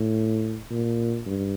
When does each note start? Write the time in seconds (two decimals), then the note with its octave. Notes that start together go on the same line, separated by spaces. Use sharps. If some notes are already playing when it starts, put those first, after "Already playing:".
Already playing: A2
0.70 A#2
1.26 G2